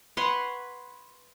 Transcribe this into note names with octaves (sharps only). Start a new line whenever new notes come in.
B4 C#5 F#5 C6